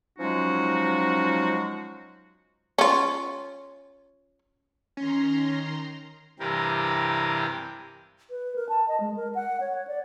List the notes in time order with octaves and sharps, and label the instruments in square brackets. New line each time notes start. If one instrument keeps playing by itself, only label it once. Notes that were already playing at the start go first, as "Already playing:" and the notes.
[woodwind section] F3 F#3 G#3 C#4 D#4 F#4
[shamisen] C#4 F4
[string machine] D#3 A#5 C6 [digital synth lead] C#4
[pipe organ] G2 C3 E3 G4 A#4
[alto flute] B4
A#4
A5
D#5
G#3
A#4
F#5
C#5
D5